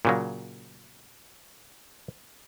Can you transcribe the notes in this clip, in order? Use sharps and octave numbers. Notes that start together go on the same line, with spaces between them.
A#2 C#3 F#3